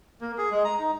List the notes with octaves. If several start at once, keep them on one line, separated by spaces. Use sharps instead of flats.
A#3
G#4
G#3
A#5
D#4